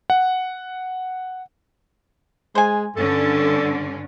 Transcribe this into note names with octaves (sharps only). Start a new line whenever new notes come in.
F#5
G#3 C5 G#5
G2 D3 C#4 A4